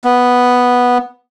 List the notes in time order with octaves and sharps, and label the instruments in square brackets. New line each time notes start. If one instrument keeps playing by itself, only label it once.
[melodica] B3